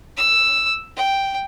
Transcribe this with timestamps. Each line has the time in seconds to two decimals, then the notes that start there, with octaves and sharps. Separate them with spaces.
0.17 E6
0.96 G5